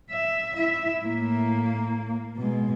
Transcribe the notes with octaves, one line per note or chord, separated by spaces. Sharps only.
E5
E4 E5
A2 A#3
B2 G#3